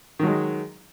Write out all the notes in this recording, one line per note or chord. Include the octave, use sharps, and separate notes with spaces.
D#3 F#3 G#3